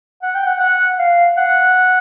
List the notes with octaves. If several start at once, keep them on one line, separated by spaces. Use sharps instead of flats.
F#5
G5
F#5
F#5
F5
F#5